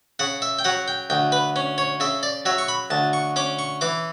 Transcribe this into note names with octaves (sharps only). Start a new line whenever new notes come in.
C#3 F#5
E5
G5
F#3 F#5
G5
D2 G5
B4
C#4
C#5
C#3 E5
D5
F#3 E5
C#6
B5
D2 A5
C#6
C#4 D6
C#6
E3 D6